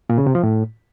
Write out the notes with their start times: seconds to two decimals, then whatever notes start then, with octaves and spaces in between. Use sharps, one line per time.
0.10 A#2
0.18 C#3
0.26 C3
0.35 F3
0.43 A2